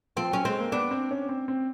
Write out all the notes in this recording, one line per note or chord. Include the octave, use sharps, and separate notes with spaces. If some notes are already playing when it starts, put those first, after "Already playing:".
F3 C4
F#3 C#4
G#3 C4
A#3
B3 D4
C4
C#4
C4
C4